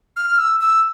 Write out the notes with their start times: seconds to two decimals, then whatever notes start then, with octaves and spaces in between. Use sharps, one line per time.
0.16 F6
0.38 E6
0.60 E6